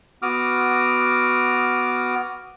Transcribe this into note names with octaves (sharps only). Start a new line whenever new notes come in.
B3 F#4 D6 D#6 F6